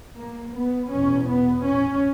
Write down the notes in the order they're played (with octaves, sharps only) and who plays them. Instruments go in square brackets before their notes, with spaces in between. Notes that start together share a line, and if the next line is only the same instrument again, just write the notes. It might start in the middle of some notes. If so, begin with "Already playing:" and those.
[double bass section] A#3
B3
E2 B2 C#4
B3
C#4